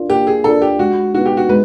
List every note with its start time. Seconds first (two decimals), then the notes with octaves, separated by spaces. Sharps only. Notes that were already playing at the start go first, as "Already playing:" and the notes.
Already playing: D4 F4 A#4 D5
0.09 A#3 G4
0.27 G#4
0.44 D4 F4 A4 A#4 D5
0.62 G4
0.79 G#3 F#4
1.14 B3 D#4 F#4
1.26 G4
1.37 F#4
1.49 G#3 B4